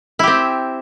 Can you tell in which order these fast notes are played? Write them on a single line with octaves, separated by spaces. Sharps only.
E4 G4 C4